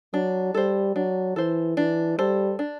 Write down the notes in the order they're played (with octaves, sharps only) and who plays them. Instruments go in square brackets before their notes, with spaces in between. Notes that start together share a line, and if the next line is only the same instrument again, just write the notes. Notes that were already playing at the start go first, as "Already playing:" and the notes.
[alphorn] F#3 [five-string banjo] D4
[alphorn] G3 [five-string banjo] A4 C5
[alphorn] F#3 [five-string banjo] D4
[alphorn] E3 [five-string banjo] A4 C5
[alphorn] E3 [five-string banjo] D4
[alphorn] G3 [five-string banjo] A4 C5
[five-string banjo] D4